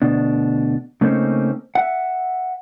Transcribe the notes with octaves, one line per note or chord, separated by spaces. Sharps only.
D2 B2 D4
C#3 A3 A#3 C4 C#4 D#4
E5 F#5